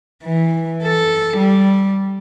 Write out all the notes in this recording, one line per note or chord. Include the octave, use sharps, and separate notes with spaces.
E3
A4
G3